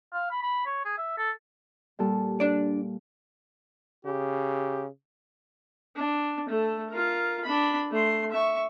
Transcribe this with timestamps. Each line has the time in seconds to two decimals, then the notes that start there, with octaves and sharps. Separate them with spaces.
0.14 F5
0.32 B5
0.43 B5
0.66 C#5
0.85 G#4
0.98 E5
1.18 A4
1.99 A#2 G3 A4
2.40 D4 D5
4.05 C#3 G4
5.97 D4
6.49 A3 A4
6.90 F4 A#4
7.45 D4 B5
7.91 A3 C6
8.31 E5 C#6